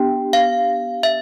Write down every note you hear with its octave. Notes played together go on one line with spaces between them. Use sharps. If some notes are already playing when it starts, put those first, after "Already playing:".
Already playing: B3 D4 G4 G5
F5
E5